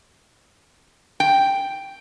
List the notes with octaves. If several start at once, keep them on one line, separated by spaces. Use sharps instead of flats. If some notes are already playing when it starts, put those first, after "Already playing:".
G5